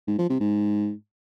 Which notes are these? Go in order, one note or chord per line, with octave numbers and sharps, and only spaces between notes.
G#2
F3
C3
G#2